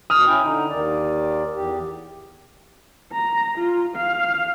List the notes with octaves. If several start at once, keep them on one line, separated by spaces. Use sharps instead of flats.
B2 D#6 F6
C#4 E4 G5
D3 D#4
D#2 D#3 D5
E2 G4
A#5
F4
F5